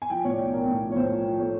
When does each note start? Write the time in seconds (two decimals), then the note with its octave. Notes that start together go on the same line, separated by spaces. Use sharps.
0.02 G#5
0.10 F3 G5
0.25 A2 C#5
0.31 D5
0.39 B1
0.53 B1 A#4
0.67 A2
0.81 F3
0.92 C#5
0.96 A2 C5
1.11 F3
1.25 F3
1.40 A3 C#5